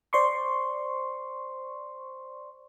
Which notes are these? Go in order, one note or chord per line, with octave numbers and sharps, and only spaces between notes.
C5 D5 C6 C#6